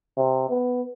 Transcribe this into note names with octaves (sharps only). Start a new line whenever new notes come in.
C3
B3